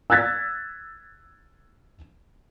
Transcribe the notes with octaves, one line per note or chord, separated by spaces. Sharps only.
E6 F#6 G#6 A6 B6